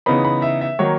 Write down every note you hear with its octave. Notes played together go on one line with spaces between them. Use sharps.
C#3 E3 B3 D#4 B5
B5
E5
E5
D#3 F#3 A#3 D#4 C#5